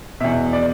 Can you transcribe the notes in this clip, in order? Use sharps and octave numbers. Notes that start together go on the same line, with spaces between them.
E2 B2 E5
D5